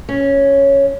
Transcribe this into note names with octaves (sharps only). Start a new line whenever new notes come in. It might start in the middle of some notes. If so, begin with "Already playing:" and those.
C#4